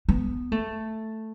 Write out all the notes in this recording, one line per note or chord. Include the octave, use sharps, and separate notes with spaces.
B3
A3